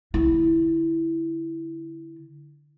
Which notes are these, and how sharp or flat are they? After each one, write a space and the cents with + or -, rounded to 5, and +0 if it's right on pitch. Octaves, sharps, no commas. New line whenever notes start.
D3 -10 E4 +0